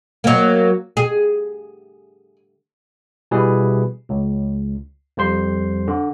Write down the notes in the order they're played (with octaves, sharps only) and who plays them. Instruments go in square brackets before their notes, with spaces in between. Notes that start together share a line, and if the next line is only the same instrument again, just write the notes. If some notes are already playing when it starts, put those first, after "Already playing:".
[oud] F#3 A#3
G#4
[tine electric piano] B2 E3 G3 G#4 B4
C#2
F2 G3 C5 C6
D3